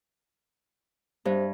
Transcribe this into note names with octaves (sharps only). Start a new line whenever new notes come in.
G2 C3